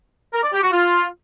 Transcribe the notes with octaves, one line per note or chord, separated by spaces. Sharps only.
A#4
D5
G4
F#4
F4